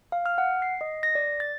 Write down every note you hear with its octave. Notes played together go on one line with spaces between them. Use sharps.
F5
F6
F#5
C7
D#5
A#6
D5
A6